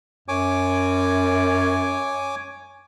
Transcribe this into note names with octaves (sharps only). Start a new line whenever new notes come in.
F#2 C#5 G#5 D6